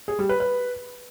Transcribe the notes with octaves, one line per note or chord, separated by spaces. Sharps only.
G#4
G3
B4
B4